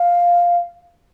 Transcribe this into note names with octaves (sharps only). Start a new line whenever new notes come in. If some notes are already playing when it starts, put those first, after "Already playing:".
Already playing: F5